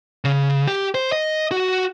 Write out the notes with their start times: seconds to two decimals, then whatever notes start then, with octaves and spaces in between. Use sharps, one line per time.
0.25 C#3
0.67 G4
0.95 C5
1.12 D#5
1.51 F#4